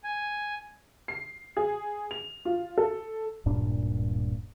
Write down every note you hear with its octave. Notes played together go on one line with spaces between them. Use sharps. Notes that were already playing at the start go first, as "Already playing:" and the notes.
G#5
C7
G#4
F7
F4
A4
D1 G2 A#2 D4